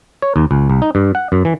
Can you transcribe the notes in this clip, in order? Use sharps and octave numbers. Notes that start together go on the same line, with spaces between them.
C#5
D#2
C#2
C2
D#4
G2
F#5
F#2
E3